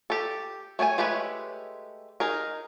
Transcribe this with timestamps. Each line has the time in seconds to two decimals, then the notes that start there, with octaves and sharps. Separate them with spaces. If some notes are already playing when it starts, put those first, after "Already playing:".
0.10 G4 A4
0.79 A3 C#5 G5 G#5
0.98 G#3 A3 G4 B4 C#5
2.20 D#4 G#4 A#4